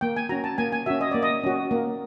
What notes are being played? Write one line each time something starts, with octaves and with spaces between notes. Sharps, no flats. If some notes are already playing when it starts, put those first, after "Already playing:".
A#3 G5
G#5
C#4 F#4 A#5
A5
A#3 G#5
G#5
C#4 F#4 E5
D#5
A#3 D5
D#5
C#4 F#4
A#3